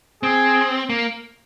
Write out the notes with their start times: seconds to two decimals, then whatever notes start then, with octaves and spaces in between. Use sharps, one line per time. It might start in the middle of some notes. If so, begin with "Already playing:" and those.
0.23 C4 G#4
0.89 A#3